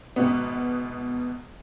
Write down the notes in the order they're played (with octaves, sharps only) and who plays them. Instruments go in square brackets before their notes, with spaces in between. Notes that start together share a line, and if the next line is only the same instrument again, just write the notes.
[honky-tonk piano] G#1 B2 B3